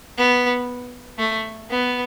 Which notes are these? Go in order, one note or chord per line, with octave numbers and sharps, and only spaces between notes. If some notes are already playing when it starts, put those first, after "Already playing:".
B3
A3
B3